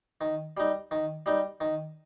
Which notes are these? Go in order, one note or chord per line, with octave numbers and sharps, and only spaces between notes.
D#3
G3 D#4
D#3
G3 D#4
D#3